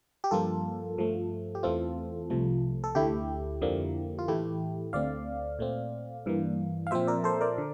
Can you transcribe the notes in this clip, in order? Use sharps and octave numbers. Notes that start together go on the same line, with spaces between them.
G4
G2 F3 A#3 F4 A4
G2 F3 A3
G4
E2 E3 A3 C4 F4 A4
C2 C3 F3 A3
A4
D2 D3 A3 E4 G4
F2 D3 F3 A#3
F4
A2 E3 A3 E4 G4
D2 D3 A3 C4 D5 F5
A#2 A3 C4
G2 E3 A#3
F5
A#2 F3 C4 C5 E5
A#4 D5
A4 C5
A#4 D5
D3